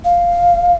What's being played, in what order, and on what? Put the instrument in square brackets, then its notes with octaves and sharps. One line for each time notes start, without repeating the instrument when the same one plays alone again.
[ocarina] F5